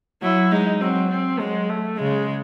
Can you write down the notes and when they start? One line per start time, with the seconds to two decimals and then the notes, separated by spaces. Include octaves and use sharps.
0.22 F#3 E4
0.52 G#3 D#4
0.81 F#3 C4
1.10 C4
1.39 F#3 G#3
1.69 A3
1.98 C#3 G#3